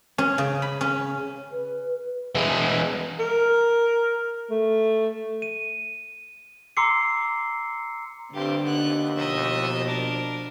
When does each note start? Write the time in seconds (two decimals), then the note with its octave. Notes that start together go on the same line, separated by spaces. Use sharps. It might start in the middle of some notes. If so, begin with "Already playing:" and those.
0.18 C#4
0.38 C#3
0.62 B5
0.81 C#4
1.51 B4
2.35 E3 G#3
3.19 A#4
4.50 A3
5.42 D#7
6.77 A#5 C6 D6 E6 C7 C#7
8.34 G2 D3 C4 G4
8.64 D#2 B3 F#6
9.16 B2 F3 D#5 E5
9.87 D4 A#4